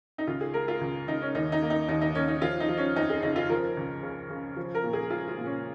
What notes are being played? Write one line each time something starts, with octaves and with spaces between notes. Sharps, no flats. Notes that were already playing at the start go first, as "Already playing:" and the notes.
D#4
C#2 F4
G#4
G#3 A#4
F4
C#2
C#2 D#4
C#4
D#2 D#4
D#4
A#3
D#4
D#2 D#4
D#4
D#2 C#4
D#4
F3 F4
D#4
F3
C#4
F2 D#4
G#4
C#3 D#4
F4
F3 A#4
C#2
C#3
C#3
F3
A#4
A#2
G#4
G#3 F4
F4
A#2
C#4